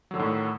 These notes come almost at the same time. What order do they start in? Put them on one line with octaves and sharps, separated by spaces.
F#3 D3 D#3 A2